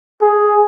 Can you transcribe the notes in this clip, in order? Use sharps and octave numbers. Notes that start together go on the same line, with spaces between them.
G#4